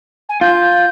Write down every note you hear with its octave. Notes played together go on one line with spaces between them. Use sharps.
G#5
F4 G6